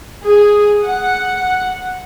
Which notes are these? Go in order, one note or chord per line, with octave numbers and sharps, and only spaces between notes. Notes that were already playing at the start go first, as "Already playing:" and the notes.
G#4
F#5